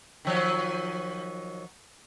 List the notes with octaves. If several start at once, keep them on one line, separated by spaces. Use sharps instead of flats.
D#3 F3 F#3